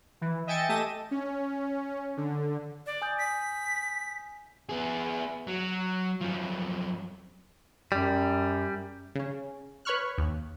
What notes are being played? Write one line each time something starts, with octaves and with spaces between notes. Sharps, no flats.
E3
D#5 E5 G5 G#5 A6 C#7
A3 G4 D#5 E5 A5 D#7
C#4
D3
D5
G#5 D#6 G6
B6
B3 G#4
F#3
F#2 F3
F#2 G3
C#3 C#4
B4 C#5 B5 C#6 F6 F#6
D#2